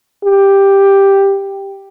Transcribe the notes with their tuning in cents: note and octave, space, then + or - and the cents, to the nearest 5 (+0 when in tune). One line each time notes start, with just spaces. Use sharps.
G4 +5